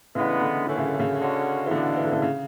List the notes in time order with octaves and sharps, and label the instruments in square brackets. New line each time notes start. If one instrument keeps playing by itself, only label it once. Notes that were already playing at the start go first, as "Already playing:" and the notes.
[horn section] A2 G#3 B3 D4 [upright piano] C#3 E3
[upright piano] D3
[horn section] F#2 E3 A3 C#4 [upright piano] D3
[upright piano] C#3
C#3
[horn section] D3 G#3 C#4 F#4
[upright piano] E3
[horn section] B2 G#3 B3 D4 F#4 [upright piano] D3
[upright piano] E3
D3
C#3 E3
C#3